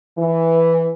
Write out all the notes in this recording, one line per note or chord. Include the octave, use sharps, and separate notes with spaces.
E3